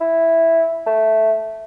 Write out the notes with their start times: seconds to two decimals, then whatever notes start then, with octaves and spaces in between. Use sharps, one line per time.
0.01 E4
0.86 A3